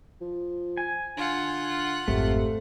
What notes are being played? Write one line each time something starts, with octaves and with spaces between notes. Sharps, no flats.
F3
G#5
D3 F4 F#5
G#1 F2 C3 A3